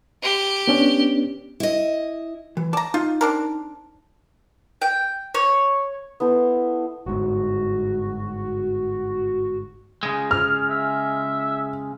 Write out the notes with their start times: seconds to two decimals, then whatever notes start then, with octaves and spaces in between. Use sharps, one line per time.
0.23 G4
0.68 B3 C#4 D4
1.60 E4 D#5
2.57 E3
2.73 D5 A5 A#5
2.94 D#4 F4
3.21 C4 D4 A#4
4.82 G5
5.34 C#5
6.20 B3 E4 A4 C5
7.06 G1 G#2 F#4
10.03 C#3 G#3
10.31 F6
10.70 E5